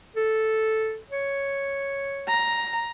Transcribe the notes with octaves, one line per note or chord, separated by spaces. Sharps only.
A4
C#5
A#5